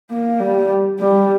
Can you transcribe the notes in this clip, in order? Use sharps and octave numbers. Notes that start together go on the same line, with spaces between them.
A#3
G3
G3